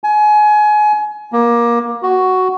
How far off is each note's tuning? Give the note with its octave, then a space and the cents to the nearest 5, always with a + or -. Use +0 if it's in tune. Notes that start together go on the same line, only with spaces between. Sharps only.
G#5 +25
A#3 +20
F#4 +5